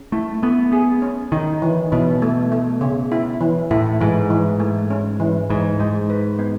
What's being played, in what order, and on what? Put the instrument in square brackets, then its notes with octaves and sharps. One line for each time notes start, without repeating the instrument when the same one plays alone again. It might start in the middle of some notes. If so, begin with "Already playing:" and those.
Already playing: [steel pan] C#4
[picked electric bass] A3 [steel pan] E4
[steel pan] A3 [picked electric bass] B3
[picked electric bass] B3 [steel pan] G#4
[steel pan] C#4
[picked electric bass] D#3 [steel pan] D#4
[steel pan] E3
[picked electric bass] B2 [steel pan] E3
[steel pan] A3
A3
C#3
E4
E3
[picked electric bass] A2 [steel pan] E4
[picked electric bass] G#2 [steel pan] E3
[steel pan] E3
A3
C#4
E3
[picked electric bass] G#2 [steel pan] E3
[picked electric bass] G#2 [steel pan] G#3
[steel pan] B4
B3